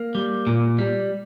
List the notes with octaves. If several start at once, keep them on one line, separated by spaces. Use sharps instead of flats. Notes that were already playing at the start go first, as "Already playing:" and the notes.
Already playing: A#3
G3
A#2
G3